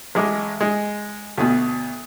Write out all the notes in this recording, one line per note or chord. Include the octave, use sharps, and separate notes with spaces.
A1 G#3 D6
G#3
D2 B2